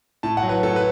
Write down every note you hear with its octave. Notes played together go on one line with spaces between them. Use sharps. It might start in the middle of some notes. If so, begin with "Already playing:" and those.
A2 A5
F#5
F#3
B4
A2 A4
B4